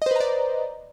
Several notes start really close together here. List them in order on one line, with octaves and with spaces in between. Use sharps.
D#5 C5 B4 A#5 D5